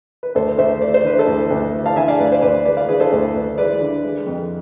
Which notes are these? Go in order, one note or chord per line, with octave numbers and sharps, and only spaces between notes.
B4
D2 A4 C5
D2 C5 E5
A3 D5
C5
D3 B4
A4 C5
D2
D2
A3
F5 A5
D3 E5 G#5
D5 F5
D2 B4 D5
C5
D2 B4 D5
G#3 B4 D5
D5 F5
D3 G#4 B4
A4 C5
D2
D2
G#3 B4 D5
D3
G#3
F2